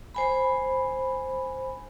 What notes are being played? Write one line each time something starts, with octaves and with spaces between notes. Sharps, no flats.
C5 G#5 B5